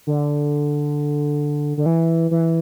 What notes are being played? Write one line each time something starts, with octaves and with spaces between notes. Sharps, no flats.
D3
D3
E3
E3